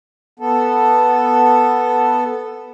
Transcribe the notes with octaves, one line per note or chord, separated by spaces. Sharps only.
B3 A4